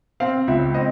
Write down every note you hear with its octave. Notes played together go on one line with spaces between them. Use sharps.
C4 F5
C#2 E5
C4 D#5